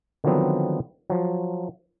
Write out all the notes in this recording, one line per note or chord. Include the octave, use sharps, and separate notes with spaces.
D3 D#3 F3 F#3 B3 C4
F3 F#3